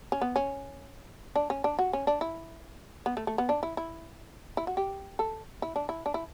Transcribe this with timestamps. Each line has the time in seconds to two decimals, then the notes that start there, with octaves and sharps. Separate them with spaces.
0.12 C#4
0.21 B3
0.36 C#4
1.36 D4
1.50 C#4
1.64 D4
1.79 F#4
1.93 C#4
2.07 D4
2.21 E4
3.06 B3
3.17 A3
3.27 A3
3.38 B3
3.49 D4
3.63 E4
3.77 E4
4.57 E4
4.67 F#4
4.77 G4
5.19 A4
5.62 E4
5.76 D4
5.89 E4
6.06 D4
6.14 E4